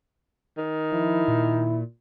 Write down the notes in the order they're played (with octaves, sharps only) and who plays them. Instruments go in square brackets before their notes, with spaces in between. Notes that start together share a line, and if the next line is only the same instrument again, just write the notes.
[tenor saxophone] D#3
[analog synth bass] F3 [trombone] E4
[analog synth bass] A#2